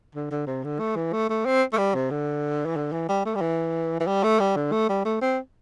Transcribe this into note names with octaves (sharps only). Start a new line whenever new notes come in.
D3
D3
C3
D3
A3
E3
A3
A3
C4
A3
G3
C3
D3
E3
D3
E3
G3
A3
G3
E3
E3
G3
A3
G3
D3
A3
G3
A3
C4